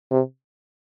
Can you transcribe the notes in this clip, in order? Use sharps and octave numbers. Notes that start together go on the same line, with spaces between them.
C3